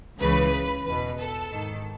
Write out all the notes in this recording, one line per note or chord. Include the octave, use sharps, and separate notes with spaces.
C#2 C#3 E3 B4
E2 B2 B4
A4
G#2 D#3